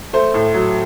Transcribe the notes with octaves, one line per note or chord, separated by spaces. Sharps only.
A3 C5
A2
F#3